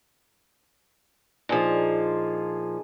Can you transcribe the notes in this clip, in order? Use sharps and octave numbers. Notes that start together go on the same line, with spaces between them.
A#2 F3 D4 D#4 G#4